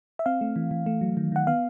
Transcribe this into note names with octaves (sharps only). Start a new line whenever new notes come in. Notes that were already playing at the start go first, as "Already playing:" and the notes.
E5
C4 F5
A3
E3
E3
A3
F#3
D#3
D#3 F#5
B3 F5